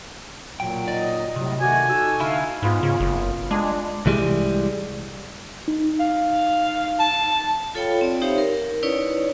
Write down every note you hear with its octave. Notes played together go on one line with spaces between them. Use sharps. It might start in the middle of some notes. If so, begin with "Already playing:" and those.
B1 A#2 F#3 G5
D#4 D5 D#5
A2 C3 F#3 G3
D#3 A3 F#4 D5 G#5
D#4 F#4 A4 E6
D3 E4 F5
G#2 B3 F4 B4
C#3
F#1
G#3 D4 C6
C2 E3 G3 G#3
D#4
F5
A5
F4 A4 C#5 F5 G5 B5
C4 D5
D#4 G4 C5 C#5 E5 F5
A#4
C#4 D#4 E4 B4 C#5 D5